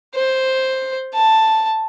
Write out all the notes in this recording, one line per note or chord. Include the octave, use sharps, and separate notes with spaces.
C5
A5